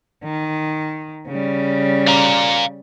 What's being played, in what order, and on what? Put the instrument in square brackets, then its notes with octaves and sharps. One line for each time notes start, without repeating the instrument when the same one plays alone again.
[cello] D#3
C#3 G3
[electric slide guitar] D5 F5 A#5